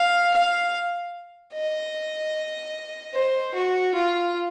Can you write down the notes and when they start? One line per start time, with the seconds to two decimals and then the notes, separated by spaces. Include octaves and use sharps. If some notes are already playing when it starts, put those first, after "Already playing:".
Already playing: F5
0.34 F5
1.54 D#5
3.14 C5
3.54 F#4
3.94 F4